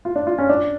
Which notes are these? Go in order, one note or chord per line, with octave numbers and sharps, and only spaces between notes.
F4
D4
F4
C#4
D4